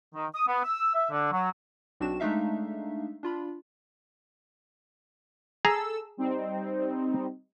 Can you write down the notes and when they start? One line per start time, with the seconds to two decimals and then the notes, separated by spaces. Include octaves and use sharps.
0.14 D#3
0.34 D#6
0.47 B3
0.64 E6
0.94 E5
1.11 D3
1.32 F#3
2.00 B1 C4 D4 F#4 E7
2.20 G#3 A3 D4 D#4 E5 F5
3.23 D4 F4 B5
5.65 G#4 A4 A#5 E6
6.17 G3 C4 D#4